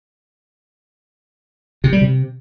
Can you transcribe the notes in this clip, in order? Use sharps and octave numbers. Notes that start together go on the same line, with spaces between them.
C3
G3
C3